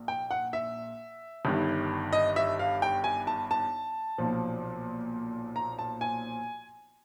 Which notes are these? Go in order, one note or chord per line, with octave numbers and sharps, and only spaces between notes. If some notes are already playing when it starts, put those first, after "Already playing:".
Already playing: A#1 A#2
G5
F#5
E5
G1 G2 D#3
D#5
E5
F5
G5
G#5
A5
A5
B1 A#2 F3
A#5
A5
G#5